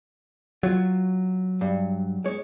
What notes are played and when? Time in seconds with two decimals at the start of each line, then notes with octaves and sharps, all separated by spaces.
0.63 F#3 F4 C#5
1.61 G2
2.24 G#3 C#5